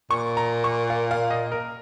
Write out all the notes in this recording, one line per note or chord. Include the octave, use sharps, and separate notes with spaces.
A#2 C#6
A#5
C#6
F5
F5
D#5
A#4